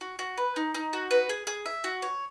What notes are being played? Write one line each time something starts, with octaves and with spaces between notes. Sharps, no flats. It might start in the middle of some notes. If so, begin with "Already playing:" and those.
F#4
F#4
B4
D#4
D#4
F#4
B4
G#4
G#4
E5
F#4
C#5